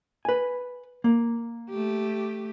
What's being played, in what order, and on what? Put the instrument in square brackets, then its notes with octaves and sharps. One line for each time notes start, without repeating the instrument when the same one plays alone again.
[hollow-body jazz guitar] B4 G#5
A#3
[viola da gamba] A3 G4